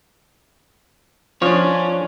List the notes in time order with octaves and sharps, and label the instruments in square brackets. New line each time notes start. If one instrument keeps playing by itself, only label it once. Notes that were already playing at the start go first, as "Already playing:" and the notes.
[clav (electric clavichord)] F3 [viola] C#4 [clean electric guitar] D4 C#5